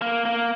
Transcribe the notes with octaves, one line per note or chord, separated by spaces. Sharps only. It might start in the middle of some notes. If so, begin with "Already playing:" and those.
A#3
A#3